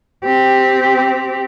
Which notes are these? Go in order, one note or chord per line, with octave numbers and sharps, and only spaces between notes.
C4 G4